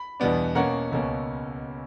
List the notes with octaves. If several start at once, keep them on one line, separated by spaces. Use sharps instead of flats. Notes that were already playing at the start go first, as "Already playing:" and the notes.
Already playing: B5
E2 B2 G3 B3 D4
B2 A#3 C#4 F#5 A#5
C#2 B2 A#3 C#4